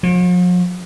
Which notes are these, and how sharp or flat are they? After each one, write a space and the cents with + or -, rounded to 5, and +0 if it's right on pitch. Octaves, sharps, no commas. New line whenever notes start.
F3 +45